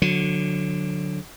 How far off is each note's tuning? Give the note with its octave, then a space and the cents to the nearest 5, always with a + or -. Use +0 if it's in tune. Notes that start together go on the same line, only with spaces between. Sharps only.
D3 +0 F#3 -25